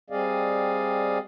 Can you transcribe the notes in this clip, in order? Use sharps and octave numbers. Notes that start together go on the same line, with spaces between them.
G3 C4 G#4 D5 D#5 F5